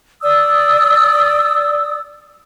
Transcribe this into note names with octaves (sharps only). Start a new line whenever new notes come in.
D5 D#6 E6